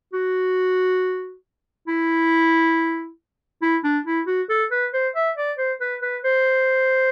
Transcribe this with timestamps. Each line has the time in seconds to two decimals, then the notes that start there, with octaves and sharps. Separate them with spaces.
0.13 F#4
1.87 E4
3.62 E4
3.84 D4
4.05 E4
4.27 F#4
4.50 A4
4.71 B4
4.93 C5
5.15 E5
5.37 D5
5.58 C5
5.81 B4
6.02 B4
6.24 C5